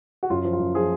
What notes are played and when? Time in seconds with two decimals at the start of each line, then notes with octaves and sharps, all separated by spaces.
0.23 F#4
0.30 F#2 F4
0.45 F3
0.53 F4
0.60 F#2
0.75 F3 G#4